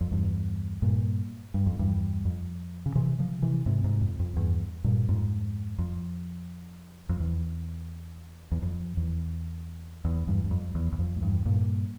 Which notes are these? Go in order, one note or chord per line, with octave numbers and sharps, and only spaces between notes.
F2
E2 G2
G2 A#2
G2
F2
E2 G2
F2
C#3
C3 E3
C#3 F3
C3 E3
G#2 C3
G#2 C3
F2
F2
E2 G2
G2 A#2
F2 G#2
F2
F2
E2
E2
F2
E2
E2
E2 G2
G2
F2
E2
E2
F2
G#2
E2 G2
G2 A#2